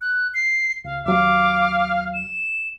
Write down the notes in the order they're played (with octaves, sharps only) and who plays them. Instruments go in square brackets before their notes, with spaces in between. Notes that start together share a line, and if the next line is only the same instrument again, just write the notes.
[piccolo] F#6
C7
[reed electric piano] C#2 [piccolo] F5
[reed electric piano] D#2 F#3 [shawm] F5 [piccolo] D6
[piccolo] E7